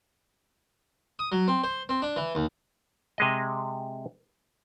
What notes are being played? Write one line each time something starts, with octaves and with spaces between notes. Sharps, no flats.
D#6
F#3
C4
C5
C4
D4
E3
D#2
C3 G#3 D#5